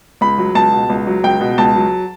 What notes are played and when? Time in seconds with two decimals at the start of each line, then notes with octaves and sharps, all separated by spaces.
0.21 C#2 B5
0.38 F#3
0.55 C#2 A5
0.72 B2
0.90 C#2
1.07 F#3
1.24 C#2 G5
1.41 B2
1.58 C#2 A5
1.76 F#3